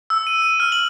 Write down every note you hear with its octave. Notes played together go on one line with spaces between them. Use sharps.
E6
D#7
D#7
F6
F#7